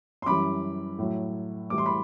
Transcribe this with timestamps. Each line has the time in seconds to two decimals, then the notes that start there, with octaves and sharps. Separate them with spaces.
0.22 C6
0.26 F#2 E3 G3 B5 D6
0.98 A2 F#3
1.70 A2 E3 G3 D6
1.78 C6
1.86 B5